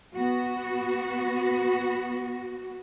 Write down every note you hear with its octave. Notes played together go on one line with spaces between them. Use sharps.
B3 F#4